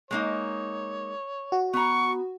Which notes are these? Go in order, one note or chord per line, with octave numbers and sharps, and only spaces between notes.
G#3 A#3 D#4 C#5
F#4
B3 A#5 C#6